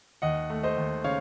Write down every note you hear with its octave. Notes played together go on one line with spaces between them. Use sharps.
D#2 D#5 F#5
A3
C5 D#5
D#2
C#3 C#5 F5